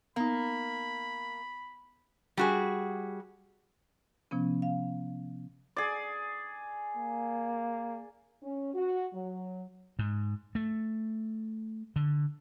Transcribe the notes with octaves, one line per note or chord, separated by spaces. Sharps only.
A#3 B3 D#4 B5
G3 F#4 G#4
C3 F3 B3 C#4
F5
G#4 D5
A#3
C#4
F#4
F#3
G#2
A3
D3